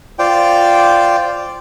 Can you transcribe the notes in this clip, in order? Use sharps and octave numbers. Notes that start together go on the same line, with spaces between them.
F4 C5 D5 G5